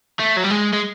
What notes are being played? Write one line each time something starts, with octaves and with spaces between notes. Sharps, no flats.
A3
F#3
G3
G#3
G#3